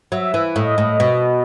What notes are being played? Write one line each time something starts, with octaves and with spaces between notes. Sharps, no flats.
F#3 E5
E3
A2 D#5
A2
B2